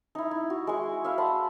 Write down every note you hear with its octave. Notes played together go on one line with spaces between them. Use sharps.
D#4 E4
E4
F#4
G#3 C#6
E5 F5 B5
F#5 A5 B5 C6